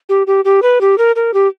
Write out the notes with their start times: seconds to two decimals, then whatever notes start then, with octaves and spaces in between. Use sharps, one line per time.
0.09 G4
0.27 G4
0.45 G4
0.62 B4
0.81 G4
0.98 A#4
1.16 A#4
1.34 G4